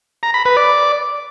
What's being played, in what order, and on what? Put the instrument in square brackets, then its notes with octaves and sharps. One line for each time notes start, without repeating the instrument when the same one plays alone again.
[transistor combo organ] A#5
B5
B4
D5